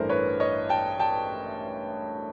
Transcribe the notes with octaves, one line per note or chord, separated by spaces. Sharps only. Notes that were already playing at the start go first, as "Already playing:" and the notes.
Already playing: A1 G2 E3 A3 A#4 C5
B4 C#5
C#5 D#5
G5 A5
G5 A5